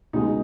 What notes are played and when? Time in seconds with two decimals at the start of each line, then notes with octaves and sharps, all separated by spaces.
0.13 C#2 B2 G#3 D#4